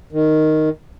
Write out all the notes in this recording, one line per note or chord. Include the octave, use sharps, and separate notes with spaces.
D#3